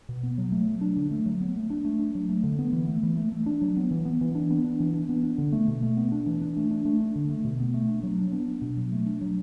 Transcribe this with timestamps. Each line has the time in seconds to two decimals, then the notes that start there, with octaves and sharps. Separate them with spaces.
0.09 B2
0.23 B3
0.38 F#3
0.52 A3
0.67 F#3
0.81 D4
0.96 D3
1.11 A3
1.26 F#3
1.41 B3
1.56 A3
1.70 D4
1.85 A3
1.99 D4
2.15 F#3
2.29 A3
2.44 D3
2.59 B3
2.73 E3
2.88 A3
3.03 E3
3.17 A3
3.32 A3
3.46 D4
3.61 F#3
3.77 B3
3.91 E3
4.05 B3
4.21 E3
4.35 D4
4.51 B3
4.64 D4
4.80 E3
4.94 D4
5.09 B3
5.23 D4
5.38 D3
5.52 A3
5.68 B2
5.83 A3
5.97 B3
6.12 D4
6.26 E3
6.42 D4
6.57 A3
6.71 D4
6.85 A3
7.00 D4
7.16 D3
7.30 A3
7.45 B2
7.60 B3
7.74 A3
7.89 D4
8.03 F#3
8.18 D4
8.32 B3
8.48 D4
8.62 B2
8.77 F#3
8.92 A3
9.06 D4
9.21 F#3